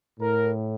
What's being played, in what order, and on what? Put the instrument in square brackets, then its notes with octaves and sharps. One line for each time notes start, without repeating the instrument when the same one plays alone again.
[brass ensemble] A2 A#4